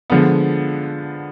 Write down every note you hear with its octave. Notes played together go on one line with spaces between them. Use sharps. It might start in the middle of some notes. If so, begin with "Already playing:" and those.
D3 F3 G#3 B3